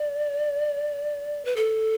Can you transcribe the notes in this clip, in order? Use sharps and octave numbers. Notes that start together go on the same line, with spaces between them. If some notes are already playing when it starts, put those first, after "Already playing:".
Already playing: D5
B4
A4